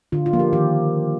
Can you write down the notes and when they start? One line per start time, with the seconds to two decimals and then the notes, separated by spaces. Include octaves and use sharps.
0.12 D3 F4
0.26 F4
0.33 F3 A#3
0.39 G4
0.53 D#3 G4